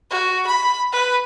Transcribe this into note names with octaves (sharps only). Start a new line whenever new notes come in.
F#4
B5
B4